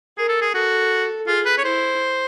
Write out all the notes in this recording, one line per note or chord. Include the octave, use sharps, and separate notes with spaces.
G#4 A#4
A4
G#4
F#4 A4
F4 G#4
B4
C#5
E4 C5